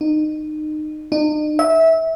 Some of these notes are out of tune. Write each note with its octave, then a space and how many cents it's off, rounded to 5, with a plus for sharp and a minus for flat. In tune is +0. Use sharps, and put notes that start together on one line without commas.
D#4 -25
D#4 -45
E5 -20